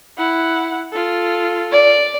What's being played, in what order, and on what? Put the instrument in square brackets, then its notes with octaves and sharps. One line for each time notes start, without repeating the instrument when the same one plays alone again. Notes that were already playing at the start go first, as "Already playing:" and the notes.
[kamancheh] E4 F#5
F4 A4
[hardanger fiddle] D5